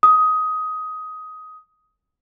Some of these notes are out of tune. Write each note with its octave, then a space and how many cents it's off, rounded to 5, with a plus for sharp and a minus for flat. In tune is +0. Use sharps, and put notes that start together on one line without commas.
D#6 +15